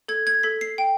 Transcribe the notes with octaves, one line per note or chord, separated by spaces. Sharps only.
A4 G#6
G#6
A4 B6
C7
G5